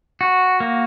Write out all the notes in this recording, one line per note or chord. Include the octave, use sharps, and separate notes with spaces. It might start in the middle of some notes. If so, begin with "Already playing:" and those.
F#4
A#3